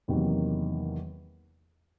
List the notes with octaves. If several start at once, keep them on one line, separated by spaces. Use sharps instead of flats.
E2 C3 D#3 F#3 A#3